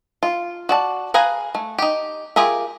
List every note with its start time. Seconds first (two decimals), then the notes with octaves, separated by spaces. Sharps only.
0.23 F4
0.69 F#4 D5 A5
1.14 G#4 B4 F5 G#5 A#5
1.55 A3
1.79 D#4 G4
2.36 F4 G4 G#4 A#4 E5